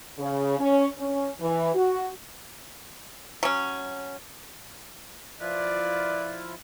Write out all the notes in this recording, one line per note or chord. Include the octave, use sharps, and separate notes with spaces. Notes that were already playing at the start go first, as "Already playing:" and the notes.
C#3
C#4
C#4
E3
F#4
F#3 C#4
F3 E4 F4 B4 D5